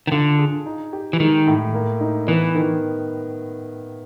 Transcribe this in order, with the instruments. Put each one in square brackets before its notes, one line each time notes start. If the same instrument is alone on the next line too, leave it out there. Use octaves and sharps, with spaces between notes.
[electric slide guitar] D#3
[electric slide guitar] D3 [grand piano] F4
[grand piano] G#4
D#4
G4
[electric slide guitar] E3
[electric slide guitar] D#3 [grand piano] G#3
[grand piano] A2
A#3
D#4
[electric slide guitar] E3 [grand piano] B3
[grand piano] D#3